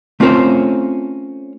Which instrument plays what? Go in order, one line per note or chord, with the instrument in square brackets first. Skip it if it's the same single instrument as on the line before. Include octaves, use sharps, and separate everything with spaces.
[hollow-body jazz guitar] A3 C4 C#4 F4 A#4 C5